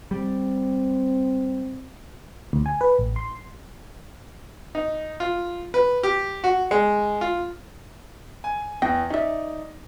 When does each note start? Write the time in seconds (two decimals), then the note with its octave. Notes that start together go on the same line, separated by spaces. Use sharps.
0.11 G3 C4
2.53 D2
2.66 G#5
2.81 B4
2.98 A1
3.16 C6
4.75 D#4
5.20 F4
5.74 B4
6.03 G4
6.44 F#4
6.71 G#3
7.21 F4
8.44 G#5
8.82 E2 G5 A#6
9.10 C#4 D#4 D5 E5